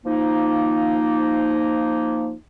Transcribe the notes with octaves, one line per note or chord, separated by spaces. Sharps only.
F3 A#3 D#4